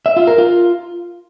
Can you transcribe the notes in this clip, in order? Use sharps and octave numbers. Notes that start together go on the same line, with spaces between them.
E5
F4
A#4
F4